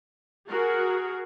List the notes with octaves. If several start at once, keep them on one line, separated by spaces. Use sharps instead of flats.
F#4 G#4 A#4